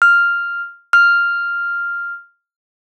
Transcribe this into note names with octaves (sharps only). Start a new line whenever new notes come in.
F6
F6